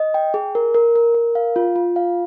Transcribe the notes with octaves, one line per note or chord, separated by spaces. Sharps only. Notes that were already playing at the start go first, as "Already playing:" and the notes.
Already playing: D#5
G5
G#4
A#4
A#4
A#4
A#4
F5
F4
F4
F5